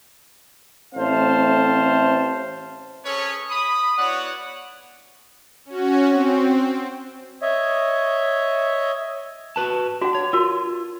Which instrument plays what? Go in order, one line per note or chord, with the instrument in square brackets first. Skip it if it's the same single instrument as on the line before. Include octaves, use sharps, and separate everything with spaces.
[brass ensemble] A1 A3 C4 C5 F5 A5
[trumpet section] C#4 G#4 A4 B4 C#5
B5 D#6
B3 E4 F#4 C#5 D5 F#5
[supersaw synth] C#4 F#4
C4
[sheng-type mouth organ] C#5 D#5 E5
[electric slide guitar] F#4 B4 A5
[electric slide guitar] D4 [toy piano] F#4 F#5
[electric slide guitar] C#5
[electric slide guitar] F4 [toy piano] F#4 A#4